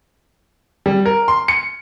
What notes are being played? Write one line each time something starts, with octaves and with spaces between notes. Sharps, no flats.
G3
A#4
C6
C#7